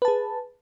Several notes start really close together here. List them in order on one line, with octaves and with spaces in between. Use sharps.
B4 A5 G#4